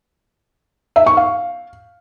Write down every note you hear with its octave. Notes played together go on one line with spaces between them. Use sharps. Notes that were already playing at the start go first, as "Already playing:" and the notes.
E5
C#6
F5